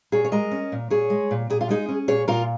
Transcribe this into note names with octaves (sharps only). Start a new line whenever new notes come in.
A#2 G#4 C#5
C#5
G#3 A#4 D#5
C#4
A#2
A#2 G#4 C#5
G#3
A#2
A#2 G#4
F4
G#3 D#4 G#4
C#4
A#2 G#4 C#5
A#2 F4 A#4